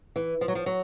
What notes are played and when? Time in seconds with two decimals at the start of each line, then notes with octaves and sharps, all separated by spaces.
0.16 E3
0.41 F3
0.48 F#3
0.55 F3
0.66 F#3